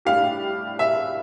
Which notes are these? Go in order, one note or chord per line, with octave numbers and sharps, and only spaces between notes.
A2 G3 D4 G4 F5
E5